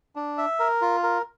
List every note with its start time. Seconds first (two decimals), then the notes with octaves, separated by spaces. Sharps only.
0.16 D4
0.38 E5
0.60 A#4
0.82 F4
1.03 A#4